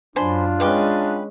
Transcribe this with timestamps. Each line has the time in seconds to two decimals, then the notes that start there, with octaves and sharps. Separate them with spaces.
0.16 F#2 D4 F4 C5 G#5 B5
0.60 G#3 C#4 B4 G5 D6